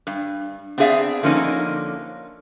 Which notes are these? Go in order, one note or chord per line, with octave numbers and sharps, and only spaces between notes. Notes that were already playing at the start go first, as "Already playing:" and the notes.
G2
B3 C4 D4 G#4 E5 F5
D3 F3 A#3 C#4 D#4